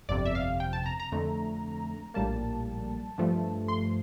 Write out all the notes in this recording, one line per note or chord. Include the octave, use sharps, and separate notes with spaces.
G1 F2 C3 D5
E5
F5
G5
A5
A#5
A#5
F2 D3 A3
A#1 A2 G3 A#3 A5
G2 F3 A3
C6